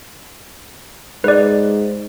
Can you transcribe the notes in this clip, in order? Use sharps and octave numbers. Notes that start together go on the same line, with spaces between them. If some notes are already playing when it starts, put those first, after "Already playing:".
G#2 B4 D5